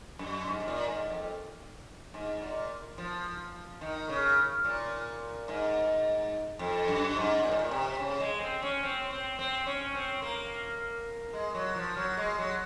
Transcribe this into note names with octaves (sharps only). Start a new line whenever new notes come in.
F#2
G#2
G#2
A#2
G#2
F2
G#2
A#2
F3
D#3
C#3
A#2
G#2
F2
F#2
G#2
A#2
G#2
A#2
C3
C#3
G#3
C4
C#4
C4
C4
C4
C#4
C4
A#3
G#3
F#3
F3
F#3
G#3
F#3